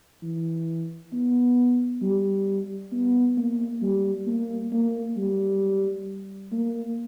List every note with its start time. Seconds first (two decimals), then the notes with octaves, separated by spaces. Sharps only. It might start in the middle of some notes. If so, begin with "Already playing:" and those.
0.23 E3
1.13 B3
2.02 G3
2.92 B3
3.37 A#3
3.82 G3
4.27 A#3
4.72 A#3
5.17 G3
6.52 A#3